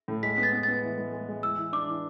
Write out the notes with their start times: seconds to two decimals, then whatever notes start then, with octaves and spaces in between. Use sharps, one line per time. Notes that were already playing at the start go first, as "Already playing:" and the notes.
0.08 A2
0.23 G#3 B6
0.38 B3
0.43 A6
0.53 B3
0.63 B3 A6
0.83 E3
0.98 G#3
1.13 G#3
1.29 G#3
1.43 E3 E6
1.57 E3
1.73 D4 D6
1.88 E3